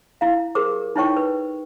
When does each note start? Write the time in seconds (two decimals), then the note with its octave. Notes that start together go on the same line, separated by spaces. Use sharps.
0.21 E4 F5
0.55 G4 G#4 A#4 C5 D6
0.96 D#4 E4 C5 C#5 G5 C#6
1.17 B4